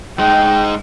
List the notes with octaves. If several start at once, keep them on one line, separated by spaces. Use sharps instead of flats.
G#3 D#4 G5